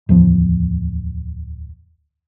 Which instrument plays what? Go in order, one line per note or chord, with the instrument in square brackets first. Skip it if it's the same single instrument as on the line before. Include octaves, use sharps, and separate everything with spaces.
[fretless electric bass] D1 E2 F3